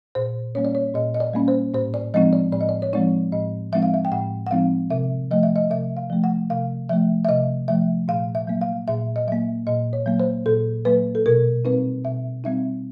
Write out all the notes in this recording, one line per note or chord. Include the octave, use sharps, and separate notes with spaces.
A#2 C5
G3 A#3 C#4 C#5
D5
C#5
A#2 D#5
D#5
D5
G3 A#3 C#4
C5
A2 C5
D5
F3 G#3 C4 D#4 D#5
D5
A2 D5
D#5
D5
C#5
F3 G#3 C4 D#4 D5
A2 D#5
F3 G#3 C4 D#4 E5
F5
E5
G5
A2 F#5
F#5
F3 G#3 C4 D#4 F5
C3 E5
F3 A3 D#5
E5
D#5
C3 E5
F5
F3 A3
F#5
C3 F5
F3 A3 E5
E5
C3 D#5
F3 A3 E5
A#2 F5
E5
F#3 A#3
F5
A#2 E5
D#5
F#3 A#3 E5
A#2 D#5
C#5
F#3 A#3
C5
A#2 A4
F#3 A#3 B4
A4
B2 A#4
G3 C4 D#4 B4
B2 E5
G3 C4 D#4 E5